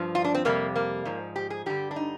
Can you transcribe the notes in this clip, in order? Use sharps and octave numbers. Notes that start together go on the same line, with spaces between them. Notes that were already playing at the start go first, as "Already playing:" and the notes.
Already playing: G2 F3
F4
D4
C4
F2 C3 G3 A#3
A#3
G#2 F3
G4
G#4
G2 D3 G3 G4
D4
D#4